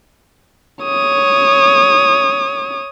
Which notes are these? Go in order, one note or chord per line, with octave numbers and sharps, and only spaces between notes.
C#5 D#6